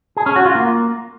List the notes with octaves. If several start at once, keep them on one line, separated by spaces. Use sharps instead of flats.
G#4
C#4
F#4
F4
A#3